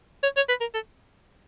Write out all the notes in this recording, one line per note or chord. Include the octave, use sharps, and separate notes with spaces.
C#5
C#5
B4
A#4
A4